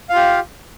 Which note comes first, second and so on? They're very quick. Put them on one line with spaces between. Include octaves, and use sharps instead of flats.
F5 F4 G4